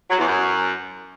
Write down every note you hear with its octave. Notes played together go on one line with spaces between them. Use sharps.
F#3
E2
F#2